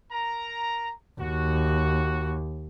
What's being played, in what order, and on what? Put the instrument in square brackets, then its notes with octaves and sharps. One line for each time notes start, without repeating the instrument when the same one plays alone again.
[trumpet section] A#4 A#5
[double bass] D#2 [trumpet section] F#4